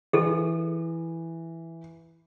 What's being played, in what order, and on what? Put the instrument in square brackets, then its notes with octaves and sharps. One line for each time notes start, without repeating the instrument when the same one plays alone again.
[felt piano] E3 [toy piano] G#4 A4